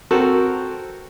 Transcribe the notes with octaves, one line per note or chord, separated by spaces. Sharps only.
C4 F#4 A4 A#4